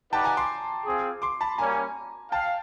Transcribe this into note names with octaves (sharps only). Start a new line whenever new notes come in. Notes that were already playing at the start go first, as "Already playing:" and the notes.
D#4 G4 B4 D5 F#5 G5 A5
G#5 A#5
C6 D6
C4 F4 G#4
C6 D6
A5 B5
G3 A#3 C#4 G#5 A#5
F5 G5 A5